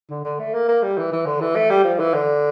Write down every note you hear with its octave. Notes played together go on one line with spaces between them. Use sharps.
D3
D3
A3
A#3
A#3
G3
E3
E3
D3
E3
A3
G3
F3
E3
D3